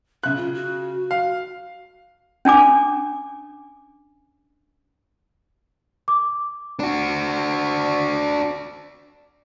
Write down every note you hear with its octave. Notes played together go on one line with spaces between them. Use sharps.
C#3 E5 F#6
F4
F#4
F5
C#4 D4 G#5 D6
D6
D4 F#4